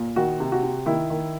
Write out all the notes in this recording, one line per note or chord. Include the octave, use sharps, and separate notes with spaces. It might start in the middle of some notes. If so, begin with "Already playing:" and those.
Already playing: A#2
D#3 F#4
C3
F#4
C3
D#3 E4
D#3